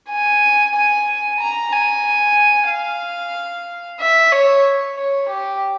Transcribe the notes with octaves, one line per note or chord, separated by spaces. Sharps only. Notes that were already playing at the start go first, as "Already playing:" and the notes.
G#5
G#5
A#5
G#5
F5
E5
C#5
C#5
G4